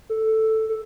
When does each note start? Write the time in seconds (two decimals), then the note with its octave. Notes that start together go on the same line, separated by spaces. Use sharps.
0.10 A4
0.69 A4